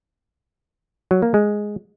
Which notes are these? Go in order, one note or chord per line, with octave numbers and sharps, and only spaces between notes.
F#3
A#3
G#3